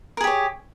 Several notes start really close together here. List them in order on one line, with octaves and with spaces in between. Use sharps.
A#4 G#4 G4 C#5